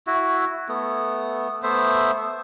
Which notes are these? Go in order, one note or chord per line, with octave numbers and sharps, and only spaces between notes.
E4 F#4
A3 B3
A3 B3 C5 E5